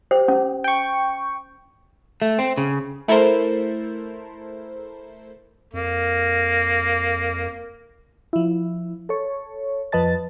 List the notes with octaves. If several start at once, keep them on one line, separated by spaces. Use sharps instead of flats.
G4 C5
C#4
G5 C#6
A3
C4
C#3
A3 E4 A4 A#4 C5
F2 A#3
F3 E4
A4 C#5
F2 F3 B4 D#5 A5 A6